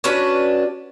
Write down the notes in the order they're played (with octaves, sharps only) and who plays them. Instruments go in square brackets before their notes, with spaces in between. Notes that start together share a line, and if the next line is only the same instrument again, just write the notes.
[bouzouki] C#4 D4 F#4 B4